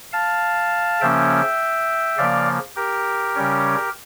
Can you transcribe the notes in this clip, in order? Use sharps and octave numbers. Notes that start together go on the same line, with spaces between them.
F5 A5
C#3 F3 A#3 C#4 E5 G5
C#3 F3 A#3 D5 F5
G4 A#4
C#3 G3 C#4